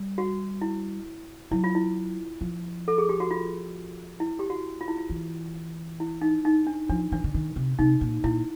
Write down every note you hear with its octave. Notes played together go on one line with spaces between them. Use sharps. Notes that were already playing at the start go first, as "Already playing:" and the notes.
Already playing: G3
F#4
E4
F#3 E4
F4
E4
F3
A4
G#4
G4
F#4
F4
E4
G4
F#4
F4
E4
F4
E3
E4
D#4
D#4
D4
F3 D4
E3 D4
D3
D#3
C3
C3 D#4
A#2
A#2 E4